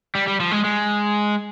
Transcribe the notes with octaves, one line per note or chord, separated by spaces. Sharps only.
G3
G3
F3
G#3
G#3